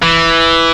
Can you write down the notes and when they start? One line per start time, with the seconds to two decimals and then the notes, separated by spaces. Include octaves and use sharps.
0.02 E3